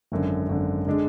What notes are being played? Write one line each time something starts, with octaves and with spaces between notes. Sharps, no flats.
G#1 F#2 D3
G#1 F#2 D3
D3 G#3 D4